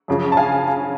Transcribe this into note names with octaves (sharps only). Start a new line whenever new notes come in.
F#2 C#3 F3
A5
F5 G#5